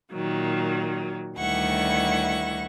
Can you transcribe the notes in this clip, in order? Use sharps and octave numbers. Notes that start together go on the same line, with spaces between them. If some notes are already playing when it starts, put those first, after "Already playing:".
A#2 D#3 F#3
D2 D#3 G3 E4 F#5 C#6